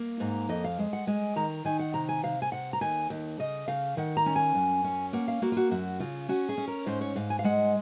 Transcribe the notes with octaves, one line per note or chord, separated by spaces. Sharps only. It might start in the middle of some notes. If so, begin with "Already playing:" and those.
Already playing: A#3
G#2 A#5
F2 D#5
F5
G#3
F#5
G#3 G#5
D#3 A#5
D#3 G#5
F#5
C3 A#5
G#5
C3 F5
G#5
C3 F#5
A#5
D#2 G#5
D#2
C#3 D#5
C#3 F5
D#3 F#5
A#5
C#4
G#5
F#2
C#4
A#3 F#5
F5
A#3 F#4
F4
F#4
F#2 F#4
C#3 F4
C#4 F#4
G#4
C#4
A#4
G#2 C5
C#5
G#2 F5
G#5
F5
G#3 F#5